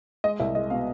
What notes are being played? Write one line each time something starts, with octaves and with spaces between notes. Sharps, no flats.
G#3 D#5
C2 E5
G#3 D#5
B2 F5